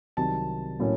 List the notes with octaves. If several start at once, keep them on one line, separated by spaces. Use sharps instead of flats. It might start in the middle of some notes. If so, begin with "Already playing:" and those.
C2 C3 D#3 F#3 A5
A2 F#3 A#3 C#4